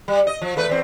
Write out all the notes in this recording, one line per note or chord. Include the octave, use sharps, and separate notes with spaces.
G3
D#5
F3
E2 A3 B4
E2 C4